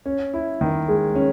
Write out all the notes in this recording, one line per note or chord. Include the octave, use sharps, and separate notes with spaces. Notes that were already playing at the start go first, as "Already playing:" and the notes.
C#4
E4
D#3
G#3
C#4